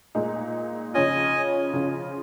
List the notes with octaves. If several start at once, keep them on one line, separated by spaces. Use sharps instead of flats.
A#2 G#3 D#4
C#3 F3 C#4 F4 D#5 G#5
C#3 F3 C#4 F4